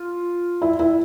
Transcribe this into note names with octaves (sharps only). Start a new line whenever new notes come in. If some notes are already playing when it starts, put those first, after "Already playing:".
Already playing: F4
E4
E4